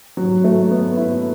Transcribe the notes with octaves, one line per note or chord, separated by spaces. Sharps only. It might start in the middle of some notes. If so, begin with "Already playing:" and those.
F#3
A3
B3
E4